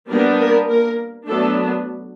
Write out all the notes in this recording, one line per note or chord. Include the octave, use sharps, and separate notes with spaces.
G3 A#3 B3 D4 A#4
A#3 A#4
A#3 A#4
F#3 A3 B3 D4 A4